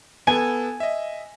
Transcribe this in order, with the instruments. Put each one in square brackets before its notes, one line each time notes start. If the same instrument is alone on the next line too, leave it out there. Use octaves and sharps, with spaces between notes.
[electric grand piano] B3 A4 [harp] G#5
[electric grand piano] D#5 E5